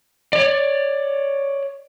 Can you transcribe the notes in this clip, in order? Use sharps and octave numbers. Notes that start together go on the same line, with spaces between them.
C#5 D5